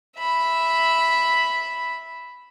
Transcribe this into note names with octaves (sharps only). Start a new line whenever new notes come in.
E5 B5